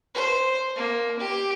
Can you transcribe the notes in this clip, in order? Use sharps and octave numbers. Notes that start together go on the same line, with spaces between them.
C5
A#3
G4